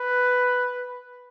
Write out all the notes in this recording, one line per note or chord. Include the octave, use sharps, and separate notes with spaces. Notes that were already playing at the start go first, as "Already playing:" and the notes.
Already playing: B4